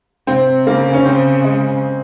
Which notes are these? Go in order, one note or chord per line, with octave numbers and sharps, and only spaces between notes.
C3 C4
C#3 A#3
C#4
C#3 C4
G#3